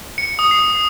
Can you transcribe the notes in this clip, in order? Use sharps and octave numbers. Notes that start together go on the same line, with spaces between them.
C#7
D#6
C7